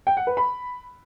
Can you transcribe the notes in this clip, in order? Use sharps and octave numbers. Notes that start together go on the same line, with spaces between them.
G5
F#5
B4
B5